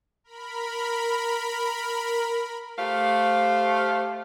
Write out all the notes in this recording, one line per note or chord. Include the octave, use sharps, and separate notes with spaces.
A#4 B5
A3 G4 C5 F5